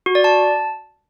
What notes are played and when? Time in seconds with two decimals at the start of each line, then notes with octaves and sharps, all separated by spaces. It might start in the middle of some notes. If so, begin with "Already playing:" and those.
0.06 F#4
0.15 D5
0.24 A5